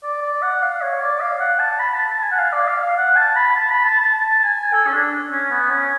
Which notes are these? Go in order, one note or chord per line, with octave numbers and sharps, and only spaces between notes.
D5
D5
F#5
F5
C#5
D5
F5
F#5
A5
B5
A5
A5
G#5
F#5
F5
D5
F5
F5
F#5
A5
B5
A5
B5
A5
A5
A5
G#5
A4
C#4
D4
C#4
B3
C#4